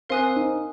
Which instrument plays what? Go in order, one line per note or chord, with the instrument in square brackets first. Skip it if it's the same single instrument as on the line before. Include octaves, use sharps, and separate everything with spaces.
[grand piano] C4 [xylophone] A#4 F5 G#5 D#6 F#6
[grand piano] D#4